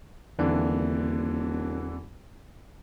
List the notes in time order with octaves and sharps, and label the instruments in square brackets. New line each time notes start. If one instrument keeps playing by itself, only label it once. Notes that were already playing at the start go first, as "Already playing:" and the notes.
[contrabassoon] D#1 [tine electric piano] E2 A#3 C4 [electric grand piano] D3 E3 D4